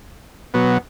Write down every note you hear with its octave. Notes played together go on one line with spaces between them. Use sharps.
B2 F#3 B3